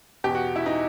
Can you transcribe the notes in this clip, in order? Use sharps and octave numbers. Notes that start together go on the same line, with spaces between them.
E2 B2 G4
F#4
E4
D#4